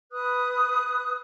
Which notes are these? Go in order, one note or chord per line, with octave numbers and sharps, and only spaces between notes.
B4 D#6 F#6